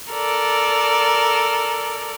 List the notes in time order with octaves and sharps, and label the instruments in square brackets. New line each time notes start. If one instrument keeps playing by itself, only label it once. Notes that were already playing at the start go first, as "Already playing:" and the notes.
[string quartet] A4 A#4 D5